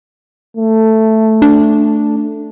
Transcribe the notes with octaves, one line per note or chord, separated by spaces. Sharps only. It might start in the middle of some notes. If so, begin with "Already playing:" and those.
A3
D4